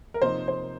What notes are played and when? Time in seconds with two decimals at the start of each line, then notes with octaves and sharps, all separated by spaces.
0.14 A#4
0.22 C3 F3 A#3 D#4 C5
0.48 C5